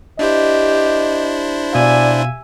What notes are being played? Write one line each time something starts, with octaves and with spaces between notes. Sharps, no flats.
D4 E4 G4 C5 D#5
B2 D5 E5 F5 G#5